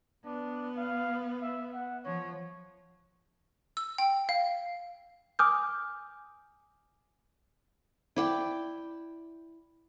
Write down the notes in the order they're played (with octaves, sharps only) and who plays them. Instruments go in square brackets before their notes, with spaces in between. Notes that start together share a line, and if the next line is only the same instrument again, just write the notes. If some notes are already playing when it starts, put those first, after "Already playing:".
[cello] B3 [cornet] D4
[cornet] F5
E5
F#5
[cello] F3 [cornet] C#5
[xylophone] E6
G5
F5
[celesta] G#5 D6 D#6 F6 G6
[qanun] E4 D5 G5